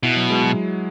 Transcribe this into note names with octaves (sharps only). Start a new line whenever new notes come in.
B2 E4
F#3
G#3
F#3